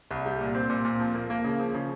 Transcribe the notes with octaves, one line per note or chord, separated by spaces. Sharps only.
C2
G3
A#2
C4
A#2
A#2
F3
A#3
A#3
C#3
F3
C#3